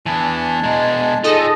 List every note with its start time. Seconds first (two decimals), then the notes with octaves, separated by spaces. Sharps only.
0.06 E3 B3 D4 G#5 A5
0.63 B2 G#3 D#5 A#5
1.24 D#4 F4 G#4 A4 D#5 G#5